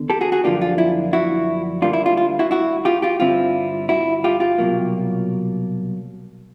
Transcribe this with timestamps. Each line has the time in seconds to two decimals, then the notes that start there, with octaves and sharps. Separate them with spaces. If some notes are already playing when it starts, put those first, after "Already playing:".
Already playing: D#2 D3 B3
0.10 G4 A4
0.21 F#4 G#4
0.32 F#4 G#4
0.44 F#2 D3 F3 A#3 D4 F4 G4
0.61 F4
0.78 E4
1.13 E4 F#4
1.82 D2 D3 G3 A#3 D4 F4
1.93 E4
2.06 F4
2.17 F4
2.39 E4 F#4
2.51 E4 F#4
2.85 F4 G4
3.02 F4 G4
3.20 G2 D3 G3 C4 E4 F4
3.89 E4 F#4
4.24 F4 G4
4.40 F4 G4
4.58 C2 B2 F#3 A#3